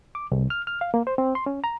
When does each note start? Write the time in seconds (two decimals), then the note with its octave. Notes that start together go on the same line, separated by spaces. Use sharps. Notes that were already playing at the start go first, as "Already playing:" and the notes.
0.15 D6
0.32 C2
0.50 F6
0.67 F6
0.81 F5
0.94 A#3
1.07 C5
1.18 C4
1.35 C6
1.46 C#4
1.64 A#5